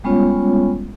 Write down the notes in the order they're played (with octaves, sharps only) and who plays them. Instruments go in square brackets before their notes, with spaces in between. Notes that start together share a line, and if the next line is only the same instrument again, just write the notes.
[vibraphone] G3 G#3 B3 C#4 F4 C#5